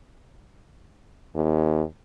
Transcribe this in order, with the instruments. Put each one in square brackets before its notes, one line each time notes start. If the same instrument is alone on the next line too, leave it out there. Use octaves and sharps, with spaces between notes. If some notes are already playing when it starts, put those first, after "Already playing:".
[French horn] D#2